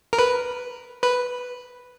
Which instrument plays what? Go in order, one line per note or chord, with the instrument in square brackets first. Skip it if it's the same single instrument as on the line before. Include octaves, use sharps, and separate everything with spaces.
[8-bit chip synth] A#4
B4
B4